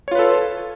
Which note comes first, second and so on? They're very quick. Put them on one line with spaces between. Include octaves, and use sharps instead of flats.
C#5 F4 B4 A4